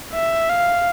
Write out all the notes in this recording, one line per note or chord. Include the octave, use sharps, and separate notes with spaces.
E5
F5